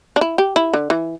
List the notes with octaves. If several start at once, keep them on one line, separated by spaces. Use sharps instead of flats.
D4
E4
G4
E4
D3
E3